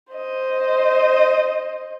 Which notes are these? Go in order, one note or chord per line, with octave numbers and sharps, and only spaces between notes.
C5 D#5